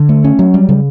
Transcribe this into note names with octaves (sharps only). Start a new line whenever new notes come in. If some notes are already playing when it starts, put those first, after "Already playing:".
Already playing: D3
A3
C#4
F#3
G3
C#3